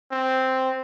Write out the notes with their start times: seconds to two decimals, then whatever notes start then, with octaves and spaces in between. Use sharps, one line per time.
0.12 C4